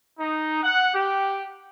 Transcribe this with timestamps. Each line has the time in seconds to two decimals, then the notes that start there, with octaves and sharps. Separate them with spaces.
0.19 D#4
0.63 F#5
0.95 G4